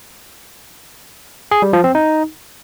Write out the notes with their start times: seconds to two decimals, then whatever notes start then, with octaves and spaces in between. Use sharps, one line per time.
1.51 G#4
1.62 G3
1.73 F3
1.84 C4
1.95 D#4